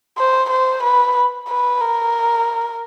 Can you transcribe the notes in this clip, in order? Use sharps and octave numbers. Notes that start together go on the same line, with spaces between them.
C5
C5
B4
B4
A#4